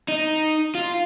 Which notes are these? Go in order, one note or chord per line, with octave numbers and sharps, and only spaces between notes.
D#4
F4